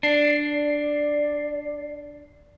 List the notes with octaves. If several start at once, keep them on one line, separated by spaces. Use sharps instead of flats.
D4 D5 C7